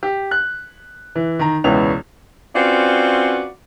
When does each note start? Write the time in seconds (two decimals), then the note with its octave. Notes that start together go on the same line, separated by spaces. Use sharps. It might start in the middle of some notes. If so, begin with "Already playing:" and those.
0.03 G4
0.31 F#6
1.15 E3
1.39 D#3 A#5
1.64 E1 C#2 E3 B3 C#4 F7
2.55 C4 C#4 F4 F#4 B4 D5